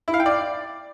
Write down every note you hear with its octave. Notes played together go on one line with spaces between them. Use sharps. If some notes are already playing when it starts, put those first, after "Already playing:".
E4
F5
G5
D5